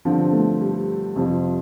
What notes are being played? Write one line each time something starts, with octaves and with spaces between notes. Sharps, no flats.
G2 D3 F3 C4
A3
G3
F2 C3 F3